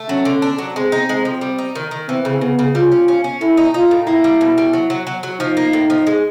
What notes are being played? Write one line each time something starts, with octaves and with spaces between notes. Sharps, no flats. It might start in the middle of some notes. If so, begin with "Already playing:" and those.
Already playing: A3
F#3 C#4
D3
D4
F#3
G#3 C4
D#4
G#3
F3
G3
D#4
D#3
D#3
E3 C4
C#3
C#3 B3
C#3
G3 F4
C#4
C#4
C#4
A2 E4
D#4
D#4 F4
A2
A#3 E4
G3
B2
G3
F#3
F#3
F#3
F#3
F3 D#4
A#3
A2
F3
G#3